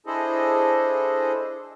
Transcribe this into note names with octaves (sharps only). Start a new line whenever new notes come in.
D4 E4 G#4 A4 C5 D#5